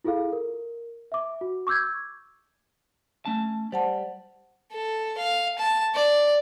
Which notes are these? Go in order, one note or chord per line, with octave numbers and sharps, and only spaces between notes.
E4 F4 G#4 A4 F5
A#4
E5 D6
F#4
C#6 D6 E6 G6 G#6
A3 C#4 A5
G3 C5 F#5 A5
A4
F5
A5
D5